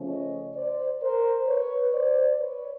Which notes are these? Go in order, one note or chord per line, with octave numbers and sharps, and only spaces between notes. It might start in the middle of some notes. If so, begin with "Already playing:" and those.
Already playing: C#3 F3 A3 C#4
C#5 D#5
C5 D5
A#4 C5
B4 C#5
C5 D5
B4 C#5